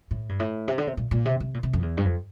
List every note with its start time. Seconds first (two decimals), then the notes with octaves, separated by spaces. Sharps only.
0.11 A2
0.29 G2
0.39 A2
0.68 C3
0.78 D3
0.87 C3
0.97 A#2
1.11 A#2
1.25 C3
1.40 C3
1.54 A#2
1.63 C3
1.73 F2
1.82 E2
1.97 G2
2.05 F2